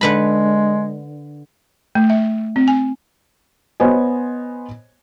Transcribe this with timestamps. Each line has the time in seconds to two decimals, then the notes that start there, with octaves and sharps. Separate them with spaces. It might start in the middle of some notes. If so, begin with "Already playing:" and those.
0.01 D3 G#3 B4 B5
1.95 A3
2.10 E5
2.56 C4
2.68 G#5
3.80 B3 C5 C#5 D#5 G#5